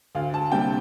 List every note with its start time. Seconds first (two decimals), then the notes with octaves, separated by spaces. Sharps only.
0.15 D2 F5
0.34 A5
0.52 C3 G3 A#3 D4 G5